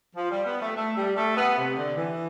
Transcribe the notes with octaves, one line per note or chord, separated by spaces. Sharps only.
F3
G3
B3
A3
A3
G3
A3
B3
C3
D3
E3